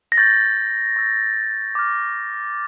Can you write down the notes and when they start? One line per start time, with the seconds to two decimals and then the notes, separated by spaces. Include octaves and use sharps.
0.12 A#6
0.18 C#6 G6 A6
0.96 C#6 E6 G6
1.75 D6 F6